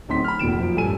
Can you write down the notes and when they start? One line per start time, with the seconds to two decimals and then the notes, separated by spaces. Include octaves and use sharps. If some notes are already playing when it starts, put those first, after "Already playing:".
0.09 D1 C4 D#4 C6 B6
0.24 B5 F6
0.39 F1 A#2 D#3 D7 E7
0.56 F#2 F3
0.76 A1 G2 A4 G#5 D#7